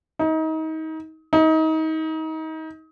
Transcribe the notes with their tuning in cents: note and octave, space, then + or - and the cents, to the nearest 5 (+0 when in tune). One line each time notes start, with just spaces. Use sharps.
D#4 +30
D#4 +30